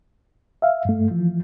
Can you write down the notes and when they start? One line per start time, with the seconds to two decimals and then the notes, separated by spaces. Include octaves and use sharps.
0.62 E5 F5
0.85 G2 A3
1.11 E3 F3